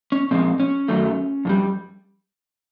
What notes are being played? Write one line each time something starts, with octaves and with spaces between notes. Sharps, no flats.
C#4
A#2 F3 G#3 C4
C#4
F#2 D#3 F#3 A3
F2 D3 G3